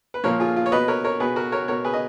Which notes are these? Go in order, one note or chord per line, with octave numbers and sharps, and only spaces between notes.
B4
A#2 F3 A#4 C#5
F4 G#4
F4
C#5
B2 B4 D#5
A#4 C#5
A#4 C#5
B2 G#4 B4
F#4 A#4
A#4 C#5
B2 A#4 C#5
G#4 B4
D#5